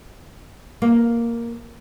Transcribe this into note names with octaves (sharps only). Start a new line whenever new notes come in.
A#3